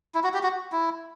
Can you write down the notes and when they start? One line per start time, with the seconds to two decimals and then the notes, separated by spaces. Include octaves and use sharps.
0.15 E4
0.24 F#4
0.34 G4
0.43 F#4
0.72 E4